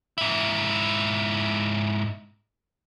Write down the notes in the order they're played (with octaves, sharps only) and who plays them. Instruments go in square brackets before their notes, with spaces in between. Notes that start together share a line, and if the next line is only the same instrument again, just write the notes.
[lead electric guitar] G#2 E4